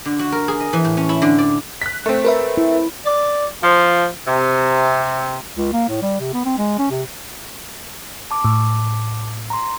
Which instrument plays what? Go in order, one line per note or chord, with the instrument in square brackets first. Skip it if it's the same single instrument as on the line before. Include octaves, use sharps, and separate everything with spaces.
[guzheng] D3
F#4
A#4
G#4
D#5
E3
A2
C#4
E4
D3
D5
[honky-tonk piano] F#6 B6
A3 C4
[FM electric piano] A#4 B4 E5
[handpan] E4
[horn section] D5
F3
C3
[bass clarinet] C#2
A#3
A2
G3
C3
B3
C4
G#3
C#4
C3
[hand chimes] A5 D6
[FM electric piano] A2
[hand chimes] A#5 C6